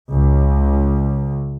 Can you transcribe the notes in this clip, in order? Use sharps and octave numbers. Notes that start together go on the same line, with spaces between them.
C#2